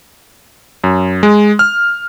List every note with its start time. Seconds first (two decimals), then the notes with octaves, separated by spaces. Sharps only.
0.84 F#2
1.23 G#3
1.59 F6